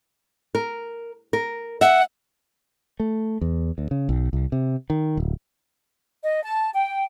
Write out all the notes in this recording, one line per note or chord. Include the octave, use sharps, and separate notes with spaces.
A#4
A#4
E5 F#5
A3
E2
D2
C#3
B1
C2
C3
D#3
D1
D#5
A5
G5